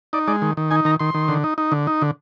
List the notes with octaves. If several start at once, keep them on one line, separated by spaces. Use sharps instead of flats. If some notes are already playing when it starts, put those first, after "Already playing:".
D#4 D5
G#3 D5
D#3
D#3
D#4 G#5
D#3 A#5
D#3 C6
D#3
D3
D#4
D#4
D3
D#4
D3